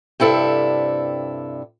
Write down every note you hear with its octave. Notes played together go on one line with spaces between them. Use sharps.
G2 C3 E4 A4